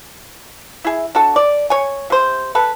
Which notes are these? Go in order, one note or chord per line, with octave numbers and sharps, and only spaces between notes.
E4 G#4
D4 F#4 A4
D5
C#5 G#5
C3 C5
A4 B4